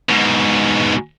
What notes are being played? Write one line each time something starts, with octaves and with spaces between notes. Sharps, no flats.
G#2 B2